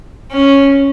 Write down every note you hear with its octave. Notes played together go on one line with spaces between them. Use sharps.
C#4